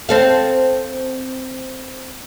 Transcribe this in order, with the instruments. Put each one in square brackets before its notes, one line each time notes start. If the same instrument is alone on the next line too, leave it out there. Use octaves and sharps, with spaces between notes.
[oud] C4 A4 F5